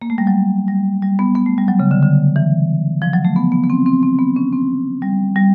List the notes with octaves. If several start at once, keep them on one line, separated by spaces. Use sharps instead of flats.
A#3
A3
G3
F#3
G3
G3
B3
B3
A3
G3
F#3
C#3
D3
D3
E3
F3
F#3
A3
B3
B3
B3
C4
C4
C4
B3
C#4
C4
G3
G3